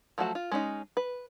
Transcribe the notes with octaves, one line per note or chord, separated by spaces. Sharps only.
F3 F#3 A3 F#4 A5
F4
G#3 C#4 D#4
B4